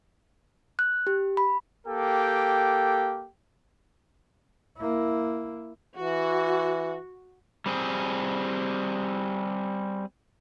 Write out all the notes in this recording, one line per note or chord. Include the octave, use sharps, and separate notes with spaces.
F#6
G4
B5
A#3 G4 A4 G5
A#3 E4
E3 F#4
G3 C4 G#4